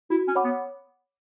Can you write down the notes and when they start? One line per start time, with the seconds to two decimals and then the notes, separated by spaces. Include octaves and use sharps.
0.10 E4 F#4
0.28 C#4
0.35 C#5 F#5 B5 D6
0.44 B3